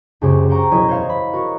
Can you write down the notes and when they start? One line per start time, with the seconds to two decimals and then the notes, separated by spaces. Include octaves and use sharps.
0.21 C#2 F#2 C#3 C#4 G4 C5
0.49 C5 F#5 G5 A#5 C#6
0.71 E1 F#3 C#4 E4 D#5
0.89 C5 C#5 F5
1.09 B5
1.33 F#4 A#4 C#6